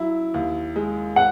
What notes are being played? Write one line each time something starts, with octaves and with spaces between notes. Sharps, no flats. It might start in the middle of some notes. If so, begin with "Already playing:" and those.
Already playing: F#3 E4
D#2
G#3
F#5